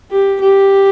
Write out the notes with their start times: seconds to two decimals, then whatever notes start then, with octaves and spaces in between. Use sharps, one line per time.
0.11 G4
0.41 G4